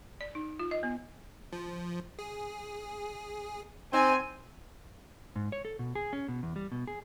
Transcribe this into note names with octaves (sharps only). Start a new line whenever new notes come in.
D5
D#4
F4
D#5
B3
F3
G#4
C4 D#4 C5 G#5
G#2
C#5
A4
B2
G#4
C#4
B2
E2
G3
B2
G#4